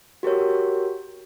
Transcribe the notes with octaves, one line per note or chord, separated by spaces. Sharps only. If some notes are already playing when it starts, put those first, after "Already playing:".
F#4 G4 A#4 C#5